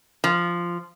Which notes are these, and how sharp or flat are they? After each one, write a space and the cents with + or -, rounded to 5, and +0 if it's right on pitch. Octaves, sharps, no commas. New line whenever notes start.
F3 -10